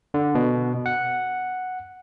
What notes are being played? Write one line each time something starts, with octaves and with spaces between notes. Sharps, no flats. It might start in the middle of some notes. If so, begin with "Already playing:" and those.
D3
B2
F#5